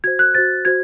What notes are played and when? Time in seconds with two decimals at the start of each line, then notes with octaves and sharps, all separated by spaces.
0.04 F#4 C5 G#6
0.19 F#6
0.35 F#4 C5 A6
0.65 F#4 C5 G#6